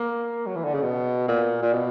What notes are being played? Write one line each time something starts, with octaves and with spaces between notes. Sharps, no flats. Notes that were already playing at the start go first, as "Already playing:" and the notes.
Already playing: A#3
F#3
E3
D3
C#3
B2
A#2
A#2
B2